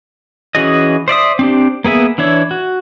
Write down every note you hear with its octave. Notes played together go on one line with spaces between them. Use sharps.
E3 C#4 F#4 G#4 D#5
C5 D5 E5 D#6
C4 D4 G4
A#3 B3 G#4 E5
E3 D4 E4 C#5
F#4